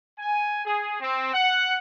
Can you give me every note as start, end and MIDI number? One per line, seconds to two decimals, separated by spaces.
0.19 0.61 80
0.65 0.97 68
1.01 1.29 60
1.34 1.77 78